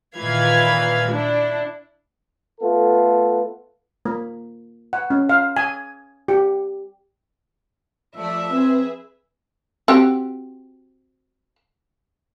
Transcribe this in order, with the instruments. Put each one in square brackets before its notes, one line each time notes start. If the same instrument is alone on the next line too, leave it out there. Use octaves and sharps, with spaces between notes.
[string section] A#2 D#3 E3 F5 B5 G#6
D4 E4
[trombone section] A3 B3 F4 A4
[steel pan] A#3
F#5
C#4
F5
G#5
G4
[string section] F3 A3 D5 [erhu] E5
[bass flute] C4 [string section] G#4 B4
[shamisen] C4 F#4 G4